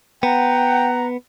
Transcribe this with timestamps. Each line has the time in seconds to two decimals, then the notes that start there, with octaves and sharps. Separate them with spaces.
0.23 B3 F#5 G5 A#5